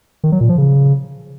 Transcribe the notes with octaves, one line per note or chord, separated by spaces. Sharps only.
D#3
F#3
A#2
F3
C#3